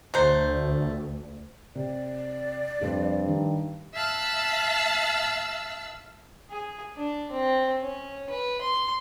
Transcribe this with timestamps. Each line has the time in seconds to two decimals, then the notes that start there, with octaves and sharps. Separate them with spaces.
0.14 D2 F#3 A3 C5
1.75 C3 D5
2.81 F1 G2 C4
3.28 D#3
3.94 E5 F5 A5 E6 F#6
6.50 G#4
6.96 D4
7.31 C4
7.81 C#4
8.30 B4
8.61 C6